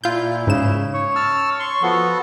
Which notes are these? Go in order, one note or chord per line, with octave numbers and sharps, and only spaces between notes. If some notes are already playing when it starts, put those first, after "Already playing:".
A#2 E4 F4 G6
G#2 C#3 E7
C#5
A5 E6 F6
C6 C#6
F3 B3 F#4 A4